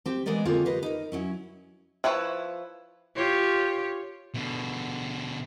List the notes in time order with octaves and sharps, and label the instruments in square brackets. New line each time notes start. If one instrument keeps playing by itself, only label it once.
[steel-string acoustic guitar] C4 G4
E3 G#3 B3 A#4 D5 D#5
D3 A#3 C4 F4 G#4 C#5
G4 B4 C5 D#5
D#4 A#4
F#3 C#4 E4
[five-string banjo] F3 E4 B4 C#5
[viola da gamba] F4 G4 C#5
[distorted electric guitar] B2 D3